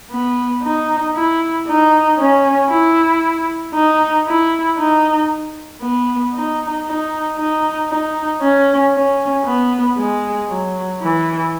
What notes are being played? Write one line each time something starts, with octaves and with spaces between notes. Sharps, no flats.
B3
D#4
E4
D#4
C#4
E4
D#4
E4
D#4
B3
D#4
D#4
D#4
D#4
C#4
C#4
B3
G#3
F#3
E3